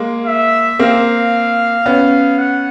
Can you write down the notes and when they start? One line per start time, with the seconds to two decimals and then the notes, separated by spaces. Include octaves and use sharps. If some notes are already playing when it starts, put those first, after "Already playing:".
Already playing: G#3 A#3
0.26 E5
0.79 A#3 C4 F5
1.86 B3 C#4
2.38 F#5